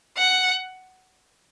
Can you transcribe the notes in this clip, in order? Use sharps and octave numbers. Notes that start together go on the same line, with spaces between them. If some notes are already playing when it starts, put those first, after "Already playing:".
F#5